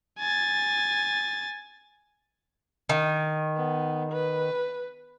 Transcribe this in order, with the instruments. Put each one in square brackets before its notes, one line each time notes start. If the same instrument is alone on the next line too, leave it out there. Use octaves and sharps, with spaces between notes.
[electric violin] G#5 A6
[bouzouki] D#3
[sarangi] B3
B4